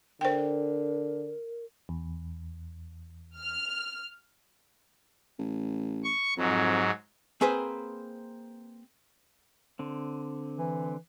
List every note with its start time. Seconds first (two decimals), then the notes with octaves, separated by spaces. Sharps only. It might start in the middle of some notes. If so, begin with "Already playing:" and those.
0.21 D3 A#4 C5 G5
1.89 E2
3.39 F6
5.39 A1
6.04 C#6
6.37 F2 G#2 F#3
7.41 A#3 C4 G#4 B4 C5
9.79 D3 C4
10.59 E3